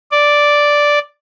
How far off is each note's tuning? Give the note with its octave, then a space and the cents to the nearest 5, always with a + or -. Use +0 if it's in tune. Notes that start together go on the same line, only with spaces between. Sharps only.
D5 -5